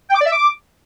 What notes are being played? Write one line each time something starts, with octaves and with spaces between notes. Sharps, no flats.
G5
D6
D5
E5
D6